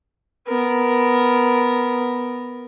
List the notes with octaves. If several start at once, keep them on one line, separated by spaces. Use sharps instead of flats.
B3 A#4